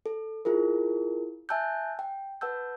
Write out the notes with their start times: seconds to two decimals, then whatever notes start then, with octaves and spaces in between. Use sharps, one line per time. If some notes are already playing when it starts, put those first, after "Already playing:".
0.06 A4
0.45 E4 F4 G#4 A#4
1.49 E5 G#5 A5 E6 F#6 G6
1.99 G5
2.41 B4 F#5 A5 E6 G6